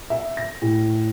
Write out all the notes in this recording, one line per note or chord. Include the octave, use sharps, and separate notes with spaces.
E5
A#6
A2